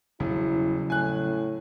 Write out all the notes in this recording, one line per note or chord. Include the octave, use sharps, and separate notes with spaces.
E1 C#3 F#3 G3 E4
A2 G#5 F#6